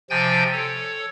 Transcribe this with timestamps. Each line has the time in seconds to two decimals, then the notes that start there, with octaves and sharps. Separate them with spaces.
0.10 C3 F3 G5 G#5 G6 A6
0.52 A4 C#5